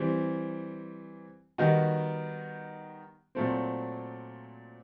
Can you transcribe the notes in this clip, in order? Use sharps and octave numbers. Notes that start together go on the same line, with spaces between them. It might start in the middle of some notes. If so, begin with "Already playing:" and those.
Already playing: E3 G3 C4
D#3 G3 B3 D#4 F#4
A#2 F#3 A3 C4